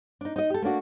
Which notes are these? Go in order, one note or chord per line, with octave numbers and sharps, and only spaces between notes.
D4 D#4
D#4 D#5
G4 A4
A3 A#3 D4 F#4